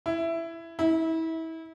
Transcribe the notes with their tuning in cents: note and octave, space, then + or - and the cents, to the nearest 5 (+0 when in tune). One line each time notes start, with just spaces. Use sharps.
E4 +10
E4 -30